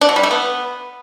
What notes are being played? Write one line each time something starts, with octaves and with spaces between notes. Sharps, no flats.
D4
F#3
G3
A3
B3